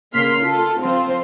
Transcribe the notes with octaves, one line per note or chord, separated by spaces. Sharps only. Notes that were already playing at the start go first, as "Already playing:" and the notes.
C#3 A#3 C6 F6 B6 C7
F4 A4
F3 C4 F4 C5